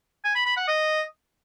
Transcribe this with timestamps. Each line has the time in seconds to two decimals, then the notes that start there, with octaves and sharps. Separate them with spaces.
0.24 G#5
0.35 B5
0.46 B5
0.57 F#5
0.68 D#5